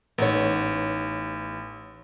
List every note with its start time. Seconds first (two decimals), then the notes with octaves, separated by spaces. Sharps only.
0.18 A1 B3 D#4 C#5